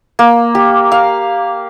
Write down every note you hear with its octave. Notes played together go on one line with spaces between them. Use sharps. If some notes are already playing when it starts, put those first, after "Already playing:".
A#3
G4
F5